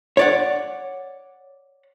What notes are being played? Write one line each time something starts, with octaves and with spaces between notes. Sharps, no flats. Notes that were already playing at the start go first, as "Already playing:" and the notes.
C#5 D5 F#5